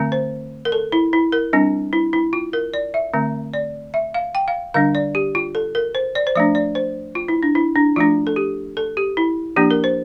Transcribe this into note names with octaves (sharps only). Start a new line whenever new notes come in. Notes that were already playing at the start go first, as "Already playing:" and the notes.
Already playing: D3 A3 C4
C5
A#4
A4
E4
E4
A#4
G3 C4 D4
E4
E4
F4
A#4
D5
E5
D3 A3 C4
D5
E5
F5
G5
F5
D3 G3 D4 F5
D5
G4
F4
A4
A#4
C5
D5
C5
F3 A3 D4 D5
D5
C5
F4
E4
D4
E4
D4
F3 A3 D4 F4
A4
G4
A4
G4
E4
F3 A#3 D4 G4
A#4
C5